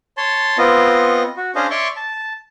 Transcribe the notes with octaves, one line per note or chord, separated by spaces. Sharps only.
C#5 A5 C6
B3 C4 F4 D#5
F#4
C#4 D4 G#4 C5 D#5 F5
C#5 D5 E5 C6 C#6
A5